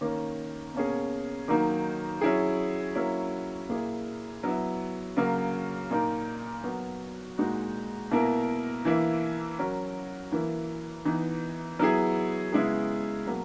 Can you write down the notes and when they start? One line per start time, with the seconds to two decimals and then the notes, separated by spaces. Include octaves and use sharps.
0.01 D#3 A#3 C#4
0.74 B2 A#3 C#4 G#4
1.48 D#3 F#3 A#3 D#4
2.21 F#3 C#4 E4 G#4
2.95 F#3 A#3 C#4 E4
3.69 A#2 A#3 E4 G#4
4.44 F#3 B3 E4
5.17 C#3 F#3 A#3
5.90 A#2 A#3 D#4 A#4
6.64 F#3 B3 F#4 A#4
7.38 A#2 G#3 D#4 F#4
8.11 B2 A#3 E4 A#4
8.85 E3 A#3 E4
9.58 F#3 C#4 F#4 A#4
10.32 E3 A#3 E4 A#4
11.05 E3 B3 D#4
11.79 F#3 B3 E4 G#4
12.52 C#3 G#3 B3 E4 G#4
13.26 B2 F#3 A#3